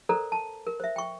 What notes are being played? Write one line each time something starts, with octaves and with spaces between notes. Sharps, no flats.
A4 A#4 C5 D5 A#5
A5
A#4
C5 E5
G5 C#6